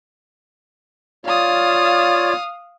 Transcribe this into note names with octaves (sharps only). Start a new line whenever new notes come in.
F4 C#5 D5 F5 D#6